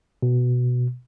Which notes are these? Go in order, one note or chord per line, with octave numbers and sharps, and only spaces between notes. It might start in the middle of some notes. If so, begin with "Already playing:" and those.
B2